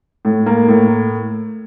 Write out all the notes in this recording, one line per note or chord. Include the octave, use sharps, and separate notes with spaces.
A2
A#3
A2